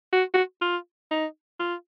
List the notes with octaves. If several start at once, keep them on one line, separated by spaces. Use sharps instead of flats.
F#4
F#4
F4
D#4
F4